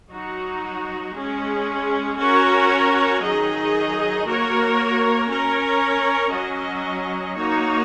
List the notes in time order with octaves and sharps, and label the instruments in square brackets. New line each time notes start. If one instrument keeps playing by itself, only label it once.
[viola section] F#3 D#4 F#4
G#3 C#4 G#4
C#4 F#4 A#4 C#5
D#3 F#3 D#4 G#4 D#5
A#3 F#4 A#4 C#5
C#4 A#4 C#5
F#3 C#4 F#4 D#5
A#3 D#4 F#4 C#5